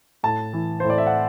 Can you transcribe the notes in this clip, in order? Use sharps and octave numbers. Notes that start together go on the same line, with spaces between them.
A2 A5
E3
C5
A2
D5
E5
F#5